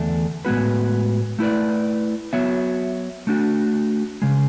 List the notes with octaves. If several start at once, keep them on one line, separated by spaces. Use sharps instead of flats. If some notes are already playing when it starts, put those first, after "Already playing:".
Already playing: E2 D3 A3 D4
A2 G#3 B3 F#4 B4
A3 E4 B4 D5
F#3 B3 F#4 C#5 E5
A3 D4 F#4
C#3 G#3